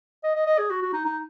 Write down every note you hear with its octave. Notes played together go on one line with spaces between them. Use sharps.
D#5
D#5
D#5
G#4
F#4
F#4
D#4
D#4